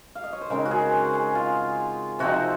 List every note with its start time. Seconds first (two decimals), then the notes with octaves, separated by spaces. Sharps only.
0.15 F5
0.24 D#5
0.33 C#5
0.41 C5
0.50 C#3 G#3 C4 D#4 A#4
0.65 F#4
0.71 G#4
0.92 C5
1.14 G#4
1.35 F4
2.19 C3 F3 C4 D#4 F#4